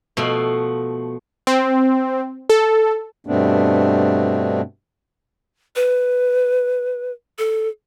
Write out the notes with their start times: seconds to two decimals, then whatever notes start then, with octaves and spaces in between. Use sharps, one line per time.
0.17 B2 F3 A3
1.47 C4
2.50 A4
3.27 G2 B2 A3 B3 C4 D4
5.76 B4
7.38 A4